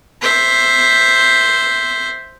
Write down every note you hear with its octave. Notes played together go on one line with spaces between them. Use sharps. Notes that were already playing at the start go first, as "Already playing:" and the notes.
C5 E5